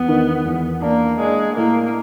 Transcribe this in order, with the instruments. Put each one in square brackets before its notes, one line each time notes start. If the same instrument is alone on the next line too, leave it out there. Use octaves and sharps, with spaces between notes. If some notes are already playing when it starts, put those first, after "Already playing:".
Already playing: [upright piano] E2 [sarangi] B3
[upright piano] D#3
E2
[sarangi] A#3 [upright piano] D4
[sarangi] G#3 [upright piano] D4
[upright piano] A2 [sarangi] A#3